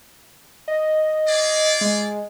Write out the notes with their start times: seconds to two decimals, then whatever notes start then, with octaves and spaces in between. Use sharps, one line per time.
0.68 D#5
1.26 F4 G#4 D5
1.81 G#3